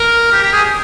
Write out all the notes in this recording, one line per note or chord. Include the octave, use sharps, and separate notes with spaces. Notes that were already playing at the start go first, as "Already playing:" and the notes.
Already playing: A#4
G4
G4
G#4